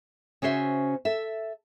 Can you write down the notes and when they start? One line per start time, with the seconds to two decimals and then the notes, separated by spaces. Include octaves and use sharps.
0.42 C#3 C#4 F#4 C5 E5
1.05 A4 E5